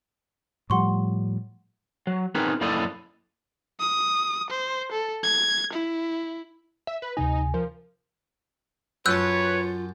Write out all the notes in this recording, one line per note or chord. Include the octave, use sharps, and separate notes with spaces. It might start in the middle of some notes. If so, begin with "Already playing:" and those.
A2 F3 G3 F#5 C6 C#6
F#3
B3 C4 D#4 G#4 A#4 B4
F#2 A#3 E4 A4 D5 D#5
D#6
C5
A4
G#6
E4
E5
B4
D2 C3 D#4 G#5
F3 A#4
F#2 F4 B4 C#5 A5 E6 F#6 G6